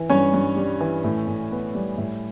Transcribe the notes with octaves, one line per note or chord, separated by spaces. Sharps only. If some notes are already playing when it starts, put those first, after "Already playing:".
Already playing: E3
G2 C#4 C#5
G2
G3
E3
A2
A2
B3
G3
A2